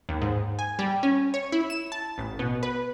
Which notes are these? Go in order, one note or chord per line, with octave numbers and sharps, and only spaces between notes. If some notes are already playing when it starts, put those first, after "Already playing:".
D#2
G#2
G#5
G3
C#4
C#5
E4
E7
A5
A1
B2
B4